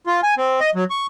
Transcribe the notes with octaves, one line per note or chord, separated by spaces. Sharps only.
F4
G#5
C4
D#5
F#3
C#6